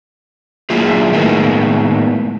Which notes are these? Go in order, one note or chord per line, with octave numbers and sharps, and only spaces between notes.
F#3 A#3 E4 F4 G#4
A2 D#3 G#3 A#3 B3